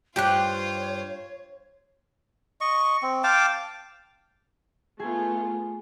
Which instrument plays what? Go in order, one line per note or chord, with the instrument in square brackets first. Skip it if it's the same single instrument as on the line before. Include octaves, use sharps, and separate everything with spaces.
[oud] G2 G4 [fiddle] F4 C5 [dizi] C#5 [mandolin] G5 F#6
[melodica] D#5 C#6
C4
F5 G5 A5 D6
[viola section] A3 B3 F4 [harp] G#4 G#5